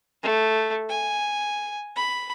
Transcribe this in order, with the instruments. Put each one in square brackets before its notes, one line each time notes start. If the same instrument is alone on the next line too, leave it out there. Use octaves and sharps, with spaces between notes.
[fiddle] A3
G#5
B5